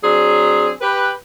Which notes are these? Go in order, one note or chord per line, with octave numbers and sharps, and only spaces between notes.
F#3 C4 D4 G#4
G4 B4